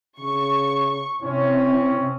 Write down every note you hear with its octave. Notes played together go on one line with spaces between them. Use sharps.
C#3 C#6
C3 C4 C#4 E4 C#5